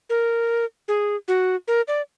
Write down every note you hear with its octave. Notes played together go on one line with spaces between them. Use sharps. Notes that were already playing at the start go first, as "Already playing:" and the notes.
A#4
G#4
F#4
A#4
D5